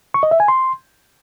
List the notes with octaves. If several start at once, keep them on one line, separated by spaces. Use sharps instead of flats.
C#6
D#5
E5
G#5
C6